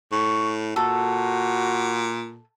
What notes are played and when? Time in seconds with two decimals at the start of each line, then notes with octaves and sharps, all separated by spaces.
0.12 A2 C#6
0.76 A#2 F#4 A4